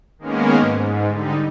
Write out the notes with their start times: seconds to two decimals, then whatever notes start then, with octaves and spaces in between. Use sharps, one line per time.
0.19 D#3 G#3 A#3 B3 C#4 A#4
0.58 G#2
1.06 D3 G3 D#4